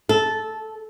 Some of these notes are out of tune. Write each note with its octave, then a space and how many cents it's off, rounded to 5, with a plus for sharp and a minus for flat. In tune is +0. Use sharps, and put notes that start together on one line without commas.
A4 -10